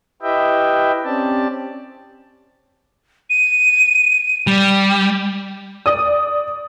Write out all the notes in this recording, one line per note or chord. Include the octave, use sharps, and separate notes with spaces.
E4 G4 B4 D#5 E5 G5
C4 C#4 G4 D5 A5
D#7
G3
D5 D#6